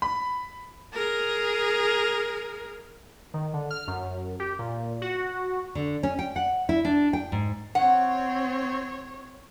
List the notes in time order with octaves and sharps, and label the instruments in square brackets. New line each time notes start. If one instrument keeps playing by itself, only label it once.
[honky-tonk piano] B5
[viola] G#4 A#4
[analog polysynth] D#3
D3
F6
F#2
G4
A#2
F#4
[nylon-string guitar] D3
C#4
G5
F#5
E4
D4
G5
G#2
[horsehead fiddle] C4 C#5 [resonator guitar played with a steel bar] F#5